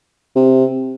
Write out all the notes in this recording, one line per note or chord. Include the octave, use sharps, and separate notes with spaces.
C3